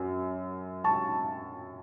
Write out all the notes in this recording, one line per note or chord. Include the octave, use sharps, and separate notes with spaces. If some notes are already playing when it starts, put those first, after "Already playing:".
Already playing: F#2
A5 C#6